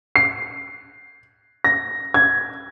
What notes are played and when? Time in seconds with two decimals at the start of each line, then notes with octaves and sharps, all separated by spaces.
0.16 C7
1.64 A#6
2.14 G#6